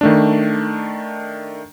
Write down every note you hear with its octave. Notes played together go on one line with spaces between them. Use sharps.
D#3 A3 D4